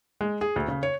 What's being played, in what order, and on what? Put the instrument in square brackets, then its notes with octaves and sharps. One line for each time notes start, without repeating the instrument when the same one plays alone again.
[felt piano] G#3
G#4
D2
C#3
C#5